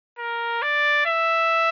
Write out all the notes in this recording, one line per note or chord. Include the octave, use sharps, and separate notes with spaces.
A#4
D5
E5